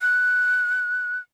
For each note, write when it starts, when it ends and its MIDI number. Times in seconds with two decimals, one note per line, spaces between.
0.01 1.18 90